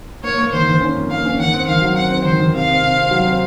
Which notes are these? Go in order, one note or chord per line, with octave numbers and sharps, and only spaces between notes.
A#3 C#5
A#3
D#3 C5
D#3
C#4
F2
A#3 F5
C#4
D#3 F#5
C4
D#3 F5
F#3
C4 F#5
C4
D#3 C5
D#3
C3 F5
C4
C3
C4
F#3
C4